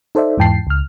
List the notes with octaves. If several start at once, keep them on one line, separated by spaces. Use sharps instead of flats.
D#4 A4 C5 D5 E5
E2 G#2 E3 G5 A5 C7
C#2 F6